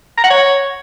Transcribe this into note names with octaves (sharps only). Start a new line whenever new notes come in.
A#5
F#5
C#5